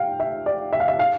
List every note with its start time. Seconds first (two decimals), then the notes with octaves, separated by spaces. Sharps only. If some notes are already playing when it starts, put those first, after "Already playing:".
Already playing: F5 G5
0.20 E5
0.46 D5
0.73 E5
0.80 F5
0.88 E5
0.99 F5